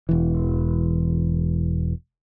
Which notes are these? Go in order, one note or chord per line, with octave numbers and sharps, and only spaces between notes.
E1 E3